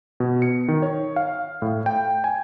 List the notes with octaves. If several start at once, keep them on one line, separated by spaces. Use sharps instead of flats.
B2
C#7
D#3
C#5
F5
A2
G5
G#5